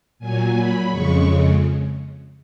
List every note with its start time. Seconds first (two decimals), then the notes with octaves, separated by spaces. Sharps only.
0.19 A#2 F#3 G#5
0.54 B5
0.90 F2 C#3 G#3 C#6